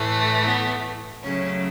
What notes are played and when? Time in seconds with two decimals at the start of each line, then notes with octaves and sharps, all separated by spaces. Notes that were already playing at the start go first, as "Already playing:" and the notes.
Already playing: A2 E3 A3
0.44 B3
1.23 C#3 F#3 A3 C#4